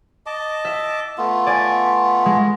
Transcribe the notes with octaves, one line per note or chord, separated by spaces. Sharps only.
D#5 A5 D6
E5
A3 B3 F4
D5 G#5
G#3